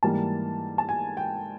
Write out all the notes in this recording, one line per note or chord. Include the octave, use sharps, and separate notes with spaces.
G#2 E3 G3 A#3 A5
A5
G#5
G5